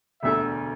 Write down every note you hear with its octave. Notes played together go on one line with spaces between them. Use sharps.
E1 D2 D3 E5